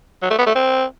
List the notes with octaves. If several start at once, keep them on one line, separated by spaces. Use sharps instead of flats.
F#3
A3
B3
A3
C4